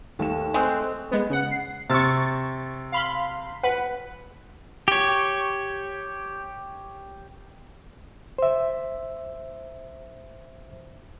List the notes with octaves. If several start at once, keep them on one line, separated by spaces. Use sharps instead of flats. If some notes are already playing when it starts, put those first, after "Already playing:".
D#2 A3 E7
G#3 C4 C#6 F#6
G#3 B3
C#3 F#5
C7
C3 C#6 E6 A6
F5 B5 C6
B4 F#5
G4 C#5
C5 E5